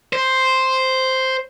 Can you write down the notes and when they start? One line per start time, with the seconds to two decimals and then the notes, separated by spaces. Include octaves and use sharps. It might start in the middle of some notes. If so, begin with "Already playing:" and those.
0.13 C5